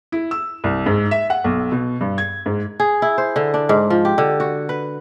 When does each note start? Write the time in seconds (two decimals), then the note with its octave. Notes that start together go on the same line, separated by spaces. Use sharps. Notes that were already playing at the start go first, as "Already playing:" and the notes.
0.12 E4
0.31 E6
0.64 C2
0.86 G#2
1.11 E5
1.30 F#5
1.44 B1
1.72 B2
2.01 G2
2.18 G#6
2.46 G#2
2.80 G#4
3.02 E4
3.18 C5
3.36 D3
3.54 D4
3.69 G#2
3.90 F3
4.05 G4
4.18 D3
4.40 F#4
4.69 B4